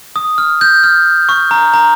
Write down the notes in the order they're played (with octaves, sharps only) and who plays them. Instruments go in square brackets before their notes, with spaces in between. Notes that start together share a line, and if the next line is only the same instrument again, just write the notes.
[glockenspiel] D#6
F6
G6
F6
C#6
A#5
A#5